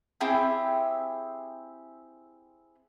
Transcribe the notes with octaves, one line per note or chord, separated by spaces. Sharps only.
C4 E4 G4 G#4